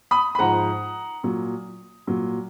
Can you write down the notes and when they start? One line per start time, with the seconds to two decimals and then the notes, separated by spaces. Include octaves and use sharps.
0.11 B5 D#6
0.35 B5
0.39 G#2 F3 F#5 A#5
1.23 A#2 F#3
2.07 A#2 F#3